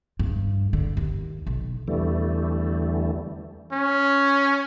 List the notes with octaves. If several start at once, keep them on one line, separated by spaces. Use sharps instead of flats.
G2
D3
D#2
B1
E2 D3 E3 G3 A3
C#4